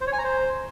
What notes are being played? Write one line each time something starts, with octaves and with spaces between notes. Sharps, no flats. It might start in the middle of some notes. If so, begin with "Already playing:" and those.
C5
C#5
G#5
A#5
C5